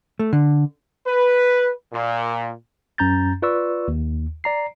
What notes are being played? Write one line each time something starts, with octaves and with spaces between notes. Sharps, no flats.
A3
D3
B4
A#2
F#2 C#4 A#5 G6 A6
F4 B4 D5 C#6 E6
D#2
D5 A#5 C7